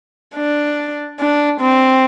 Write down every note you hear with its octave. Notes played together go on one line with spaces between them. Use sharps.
D4
D4
C4